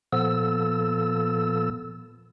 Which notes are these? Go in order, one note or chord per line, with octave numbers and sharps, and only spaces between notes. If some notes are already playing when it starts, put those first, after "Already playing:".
A#2 F3 B3 A4 E6